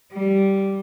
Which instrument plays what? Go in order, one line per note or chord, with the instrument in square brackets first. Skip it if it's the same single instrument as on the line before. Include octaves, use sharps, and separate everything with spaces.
[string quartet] G3